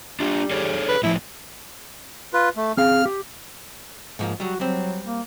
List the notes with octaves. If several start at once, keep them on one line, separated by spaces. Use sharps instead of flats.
G3 D4 F4
G#4 A4 C#5
B4
A2 F3 E4
F4 B4
A3
C4 G#4 F5 F6
G4
G#2 F3 A#3
F#3 G3 F#4
F#3 G3 C4
A#3